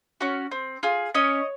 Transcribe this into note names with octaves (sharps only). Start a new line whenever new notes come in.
C#4 F#4
C4
F4 G#4
C#4 C#5 D#5